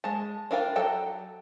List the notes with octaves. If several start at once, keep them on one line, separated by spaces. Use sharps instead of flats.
G#3 A5
D4 F4 A#4 F5 G5
F#3 A4 G5 A5